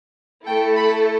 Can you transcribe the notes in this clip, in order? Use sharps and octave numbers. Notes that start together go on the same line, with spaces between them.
A3 E4 A4 G5
B5